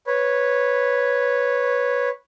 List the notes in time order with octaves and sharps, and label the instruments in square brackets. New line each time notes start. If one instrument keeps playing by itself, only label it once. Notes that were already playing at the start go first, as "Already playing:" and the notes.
[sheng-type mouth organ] B4 C#5